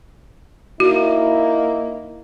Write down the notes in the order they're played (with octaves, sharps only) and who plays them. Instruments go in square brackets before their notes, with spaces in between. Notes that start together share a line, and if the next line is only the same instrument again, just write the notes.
[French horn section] A#3 D#4 E4 [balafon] F#4